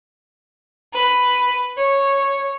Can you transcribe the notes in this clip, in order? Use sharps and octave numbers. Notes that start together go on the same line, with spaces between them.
B4
C#5